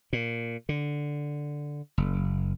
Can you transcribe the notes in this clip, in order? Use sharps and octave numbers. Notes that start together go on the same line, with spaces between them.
A#2
D3
F#1